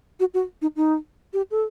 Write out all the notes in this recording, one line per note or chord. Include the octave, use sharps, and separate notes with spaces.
F#4
F#4
D#4
D#4
G4
A4